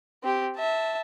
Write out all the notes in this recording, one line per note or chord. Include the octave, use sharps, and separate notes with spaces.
C4 G4
E5 A5